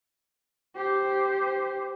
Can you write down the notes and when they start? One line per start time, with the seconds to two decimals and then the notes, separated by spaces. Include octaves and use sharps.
0.75 G4 C5